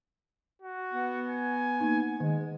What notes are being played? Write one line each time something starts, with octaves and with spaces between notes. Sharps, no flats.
F#4
B3
G#5
A#3 D#4
D#3 G#3